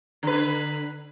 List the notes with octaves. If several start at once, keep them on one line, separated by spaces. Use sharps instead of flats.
D3 B4